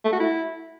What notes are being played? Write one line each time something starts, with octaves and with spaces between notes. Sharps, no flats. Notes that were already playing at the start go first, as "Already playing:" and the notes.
A3
F#4
E4